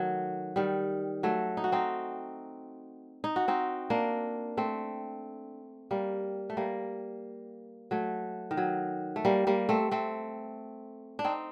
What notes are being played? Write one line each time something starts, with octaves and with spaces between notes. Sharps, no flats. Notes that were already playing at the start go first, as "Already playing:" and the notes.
Already playing: D#3 F#3 A3
D#3 G3
F#3 A3
D#4
F#4
C4 D#4
D#4
F#4
C4 D#4
A#3 D4
A3 C4
G3 A#3
A3
G3 A#3
F#3 A3
D#3
F#3
A3
G3 A#3
G3 A#3
A3 C4
A3 C4
D4
C4 D#4